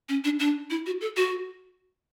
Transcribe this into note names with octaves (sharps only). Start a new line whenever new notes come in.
C#4
D4
D4
E4
F#4
A4
F#4